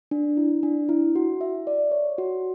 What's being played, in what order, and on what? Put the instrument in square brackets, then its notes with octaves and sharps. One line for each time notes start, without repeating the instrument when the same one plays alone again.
[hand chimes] D4
E4
D4
E4
F#4
E5
D5
C#5
F#4